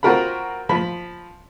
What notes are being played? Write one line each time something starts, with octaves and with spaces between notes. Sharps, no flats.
C4 F4 F#4 A#4 F#5 B5
F3 B5